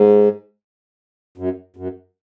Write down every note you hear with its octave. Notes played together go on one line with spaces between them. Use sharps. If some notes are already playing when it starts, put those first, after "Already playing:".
Already playing: G#2
F#2
F#2